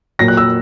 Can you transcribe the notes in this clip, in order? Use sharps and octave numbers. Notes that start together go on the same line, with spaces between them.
A#2 F#3 A#6
F#6
E6